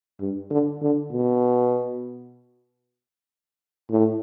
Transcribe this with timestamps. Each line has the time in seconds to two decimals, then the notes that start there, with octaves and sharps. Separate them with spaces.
0.20 G2
0.51 D3
0.82 D3
1.12 B2
3.91 A2